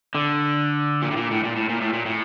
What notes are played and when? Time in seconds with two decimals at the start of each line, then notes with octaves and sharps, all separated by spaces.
0.15 D3
1.02 A#2
1.11 A2
1.16 A#2
1.31 A2
1.44 A#2
1.56 A2
1.69 A#2
1.81 A2
1.93 A#2
2.06 A2